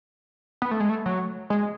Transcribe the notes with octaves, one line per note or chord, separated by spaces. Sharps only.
B3
A3
G#3
A3
F#3
G#3